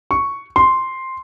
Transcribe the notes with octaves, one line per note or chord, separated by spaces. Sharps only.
C#6
C6